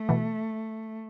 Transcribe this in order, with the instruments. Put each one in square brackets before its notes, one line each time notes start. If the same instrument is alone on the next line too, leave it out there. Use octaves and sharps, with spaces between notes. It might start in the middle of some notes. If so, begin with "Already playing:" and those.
Already playing: [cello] A3
[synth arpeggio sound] B2 E3